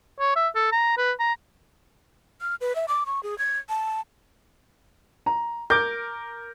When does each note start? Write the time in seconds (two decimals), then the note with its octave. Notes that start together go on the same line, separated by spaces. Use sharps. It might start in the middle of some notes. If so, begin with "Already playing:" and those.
0.20 C#5
0.36 E5
0.55 A4
0.72 A#5
0.97 B4
1.19 A#5
2.41 F6
2.61 B4
2.75 E5
2.88 D6
3.06 C#6
3.23 G#4
3.38 G#6
3.69 A5
5.26 A#5
5.70 A#4 D6 G6